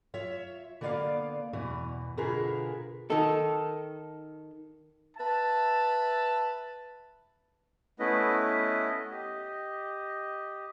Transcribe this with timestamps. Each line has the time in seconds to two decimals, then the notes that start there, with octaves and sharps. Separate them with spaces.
0.14 F4 C#5 E5
0.81 D3 A#3 B3 C#5 D5 F5
1.53 E2 B2 E3
2.17 B2 D3 F4 G#4 A#4 B4
3.10 D#3 A4
5.17 B4 E5 A5
8.00 A3 B3 C#4 E4 B4 D#5
9.11 G4 D#5